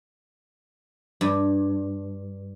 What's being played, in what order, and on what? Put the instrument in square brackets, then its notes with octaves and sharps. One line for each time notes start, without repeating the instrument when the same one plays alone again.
[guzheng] G2